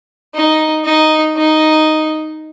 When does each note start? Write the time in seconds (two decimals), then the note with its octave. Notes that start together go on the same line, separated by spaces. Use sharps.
0.35 D#4
0.85 D#4
1.37 D#4